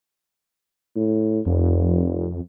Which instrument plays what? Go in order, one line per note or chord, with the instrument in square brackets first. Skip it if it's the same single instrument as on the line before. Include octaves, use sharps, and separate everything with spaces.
[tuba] A2
[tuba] F1 [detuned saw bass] F2